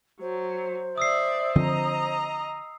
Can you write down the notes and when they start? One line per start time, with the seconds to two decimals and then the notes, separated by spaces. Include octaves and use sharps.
0.21 F#3 C5
0.98 D5 E5 D#6 E6 C7
1.56 D3 F3 C4 D#5 A#5